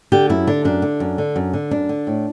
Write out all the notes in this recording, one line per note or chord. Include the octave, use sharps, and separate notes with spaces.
D3 G4
F#2 E4
D3 D4
F#2 D4
D3
F#2
D3
F#2
D3
F#2 D4
D3
A2